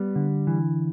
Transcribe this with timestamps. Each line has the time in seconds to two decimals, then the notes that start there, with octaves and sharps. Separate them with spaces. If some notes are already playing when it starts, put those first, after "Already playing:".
Already playing: G3 B3
0.15 D3
0.47 E3